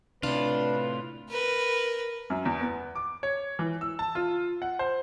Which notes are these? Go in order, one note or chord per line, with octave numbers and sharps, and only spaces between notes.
A2 C3 D4 F4 B4
A#4 B4
F#2
E2
B3
D6
C#5
E3
E6
A5
F4
F#5
C5